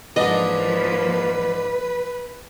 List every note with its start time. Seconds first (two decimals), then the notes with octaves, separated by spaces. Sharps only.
0.16 G#2 E3 F3 A#3 D4 B4 D#5